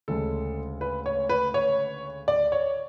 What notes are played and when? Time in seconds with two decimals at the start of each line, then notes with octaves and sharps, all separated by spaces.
0.08 D2 C#3 G#3 A4
0.81 B4
1.06 C#5
1.29 B4
1.54 C#5
2.28 D5
2.52 C#5